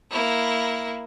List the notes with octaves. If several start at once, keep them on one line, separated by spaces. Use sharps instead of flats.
A#3 E4